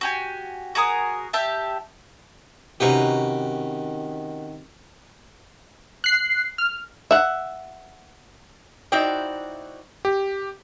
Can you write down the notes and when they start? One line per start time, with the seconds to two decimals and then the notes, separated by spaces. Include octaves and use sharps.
0.01 F#4 G4 G#5
0.75 F#4 G#4 A#4 D#6
1.33 G4 E5 A5
2.80 C3 D#3 C#4 D#4 F#4 G4 B4
6.04 F#6 C7
6.58 F6
7.11 E5 F#5
8.92 D#4 E4 F#4 C5 D5 G5
10.05 G4